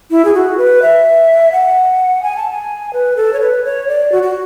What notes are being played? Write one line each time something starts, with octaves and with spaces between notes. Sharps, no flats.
E4
G#4
F#4
B4
E5
F#5
G#5
A5
G#5
B4
A4
C#5
B4
C#5
D5
F#4
F#4